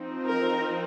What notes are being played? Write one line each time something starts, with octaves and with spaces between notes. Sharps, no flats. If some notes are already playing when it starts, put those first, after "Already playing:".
Already playing: F3 C4 D#4
A#4